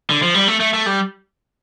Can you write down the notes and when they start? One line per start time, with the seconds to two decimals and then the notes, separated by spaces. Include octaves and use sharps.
0.10 D3
0.23 F3
0.34 G3
0.48 A3
0.60 A3
0.74 A3
0.86 G3